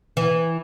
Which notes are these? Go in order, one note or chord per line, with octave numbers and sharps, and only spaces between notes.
E3